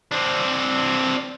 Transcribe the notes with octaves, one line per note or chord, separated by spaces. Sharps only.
C4 D4